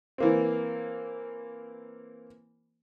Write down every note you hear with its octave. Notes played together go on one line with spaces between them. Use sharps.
E3 A#3 C4